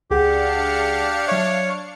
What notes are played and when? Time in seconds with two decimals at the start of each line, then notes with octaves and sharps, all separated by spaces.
0.10 C#2 D4 G4 G#4 F5 F#5 C#7
1.28 F#3 C#5 E5